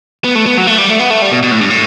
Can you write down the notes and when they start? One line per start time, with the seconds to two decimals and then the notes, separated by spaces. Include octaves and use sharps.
0.24 B3
0.35 A3
0.46 B3
0.57 F#3
0.67 A3
0.78 G3
0.89 A3
0.99 B3
1.10 A3
1.22 G3
1.31 B2
1.43 B2
1.51 A2
1.61 G2
1.70 A2